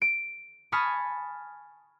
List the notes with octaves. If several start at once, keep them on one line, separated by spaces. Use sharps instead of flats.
D7
G#5 A5 B5 C#6 D#6 F6